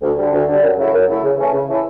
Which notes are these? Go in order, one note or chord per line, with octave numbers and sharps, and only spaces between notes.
D2
D3 G3
D2
D3 G3
F#2
C#3 F#3 A3 E4
F#2
C#3 F#3 A3 E4
C#3
E3 A3 C#4 E4
C#3
E3 A3 C#4 E4